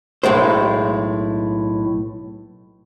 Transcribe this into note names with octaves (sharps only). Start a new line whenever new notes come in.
B1 A2 G#3 C5